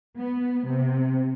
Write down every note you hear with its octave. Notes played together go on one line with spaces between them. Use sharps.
B3
C3